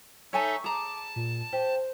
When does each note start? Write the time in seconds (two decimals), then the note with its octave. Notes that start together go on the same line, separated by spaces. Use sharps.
0.33 D#4 A4 C#5 E5 G#5 A5 C#6
0.64 G#4 A5 A#5 D6
1.16 A#2
1.53 G4 C5